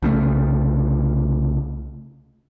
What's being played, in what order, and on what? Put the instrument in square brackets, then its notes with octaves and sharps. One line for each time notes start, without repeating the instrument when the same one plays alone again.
[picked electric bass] C2 C#3 G3 A3